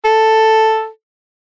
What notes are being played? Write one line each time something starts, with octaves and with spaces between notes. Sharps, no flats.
A4